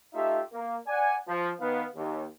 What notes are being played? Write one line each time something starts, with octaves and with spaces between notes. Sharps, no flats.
A3 D#4 F4 G4 E5
A#3
D5 F#5 G#5
F3
D#3 B3 F5
D#2